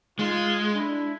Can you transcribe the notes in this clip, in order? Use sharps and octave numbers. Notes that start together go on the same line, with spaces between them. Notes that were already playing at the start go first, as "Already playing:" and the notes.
G#3 D#4 F4
D4 E4